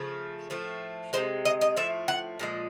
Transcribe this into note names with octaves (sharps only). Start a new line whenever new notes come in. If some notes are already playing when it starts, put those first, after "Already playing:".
Already playing: C#3 F3 A3
A2 F3 A3
C3 F3 G#3 C5
D#5
D#5
A2 F3 A3 E5
F#5
A#2 F3 G#3